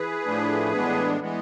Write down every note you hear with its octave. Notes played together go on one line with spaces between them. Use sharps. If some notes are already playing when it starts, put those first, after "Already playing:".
Already playing: E3 G#4 B4
A2 F3 A3 D4
A2 E3 G#3 B3 D4
E3 G#3 B3